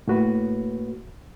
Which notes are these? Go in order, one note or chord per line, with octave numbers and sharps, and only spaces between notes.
A2 A#3 F#4 B4